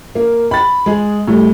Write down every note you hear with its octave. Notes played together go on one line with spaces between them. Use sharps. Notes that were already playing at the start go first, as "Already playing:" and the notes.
A#3
B5 A6
G#3 G#4
A2 G3